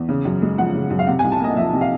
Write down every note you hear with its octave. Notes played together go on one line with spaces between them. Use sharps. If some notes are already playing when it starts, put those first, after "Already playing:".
Already playing: E2
C#3
F#2
G#3
F3 F#5
C#3
F#2
F5
C3 F#5
C2 G#5
A5
A#3 D#5
F3 E5
C3
F5